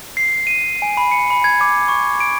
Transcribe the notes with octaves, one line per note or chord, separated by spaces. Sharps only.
C7
D#7
G#5
B5
C#7
B5
G#6
D6
C#6
D7